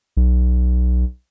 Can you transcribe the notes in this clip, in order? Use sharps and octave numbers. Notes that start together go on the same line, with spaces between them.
B1